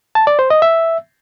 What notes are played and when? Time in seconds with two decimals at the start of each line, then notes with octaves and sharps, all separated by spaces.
0.15 A5
0.27 D5
0.39 C5
0.50 D#5
0.62 E5